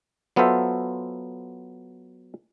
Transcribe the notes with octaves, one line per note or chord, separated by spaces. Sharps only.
F#3 B3 F4 A4 C5 E5